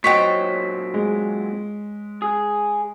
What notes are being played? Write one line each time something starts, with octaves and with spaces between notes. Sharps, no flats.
A#2 F#3 C4 C#5 D#5 G5 B6
G#3
G#4